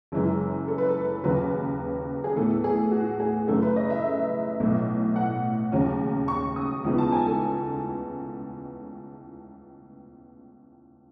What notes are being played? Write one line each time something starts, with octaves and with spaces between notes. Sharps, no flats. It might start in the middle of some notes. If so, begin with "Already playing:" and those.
F#1 F#2 E3 G#3
A4
B4
A4
D#2 C#3 F#3 B4
G#4
A2 E3 B3 A4
G#4
F#4
G#4
F#2 C#3 E3 A3 A4
B4
D#5
E5
B1 A2 E3 A3
F#5
D#2 C#3 F#3 C#4
C#6
D#6
C#2 C#3 E3 B3 D#4
A5
G#5
A4